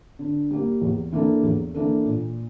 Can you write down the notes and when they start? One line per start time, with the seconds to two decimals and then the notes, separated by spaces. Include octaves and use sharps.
0.19 D3
0.51 G3 A#3
0.82 E2
1.12 E3 A#3 D4 A4
1.43 E2
1.74 E3 A#3 D4 A4
2.05 A#2